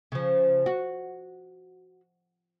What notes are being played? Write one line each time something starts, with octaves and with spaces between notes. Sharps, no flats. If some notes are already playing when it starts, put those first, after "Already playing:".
C#3 F3
F#4